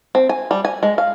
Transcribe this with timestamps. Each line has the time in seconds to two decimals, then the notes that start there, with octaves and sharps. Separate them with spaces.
0.15 C4
0.29 G#5
0.51 G3
0.65 G#5
0.83 G#3
0.98 F5